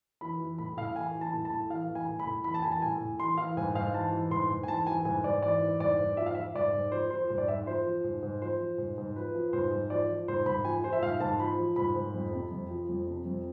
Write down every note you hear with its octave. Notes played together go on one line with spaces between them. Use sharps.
E3 B5
E3
A2 B5
A2 F5
E3 G#5
E3
A5
A2
A5
A2
E3 F5
E3
G#5
A2
B5
A2
E3 B5
A5
E3 G#5
A5
A2 G#5
A2
E3 C6
E3 F5
G#2 G#5
G#2 F5
E3 A5
E3
G#2 C6
G#2
G#5
E3 A5
E3 G#5
G#2 G#5
G#2 D5
E3 D5
E3
G#2 D5
G#2
F3 E5
F5
F3 E5
G#2 D5
G#2
F3 C5
F3 C5
G#2 C5
D5
G#2 E5
F3 C5
F3
G#2
G#2
F3 C5
F3
G#2
G#2
F3 B4
F3
G#2 C5
G#2
F3 D5
F3
G#2 C5
G#2 B5
F3 G#5
F3 C5
E5
G#2 F5
G#2 A5
F3 B5
F3
G#2 B5
G#2
F2
C3
F2
F3
F2
C3
F2